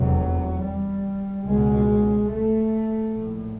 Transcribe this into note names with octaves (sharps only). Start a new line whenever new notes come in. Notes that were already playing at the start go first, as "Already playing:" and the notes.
Already playing: F1 E2 C3 F#3
G3
C#2 B2 G#3
A3
A#1 A2